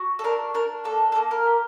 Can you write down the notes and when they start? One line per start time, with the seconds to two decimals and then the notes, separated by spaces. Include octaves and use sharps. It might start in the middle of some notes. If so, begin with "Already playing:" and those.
Already playing: F#4
0.19 A4
0.24 D4 A#4
0.54 D4 A#4
0.84 A#3 A4
1.12 A4
1.15 A#3
1.31 A#4
1.46 G4